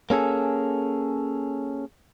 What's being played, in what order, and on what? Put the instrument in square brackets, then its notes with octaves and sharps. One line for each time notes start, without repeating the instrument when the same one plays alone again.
[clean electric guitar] A#3 C#4 G#4 A4